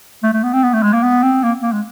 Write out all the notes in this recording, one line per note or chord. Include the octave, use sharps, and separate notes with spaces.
A3
A3
B3
C4
B3
A3
G#3
A#3
B3
C4
A#3
A#3
G#3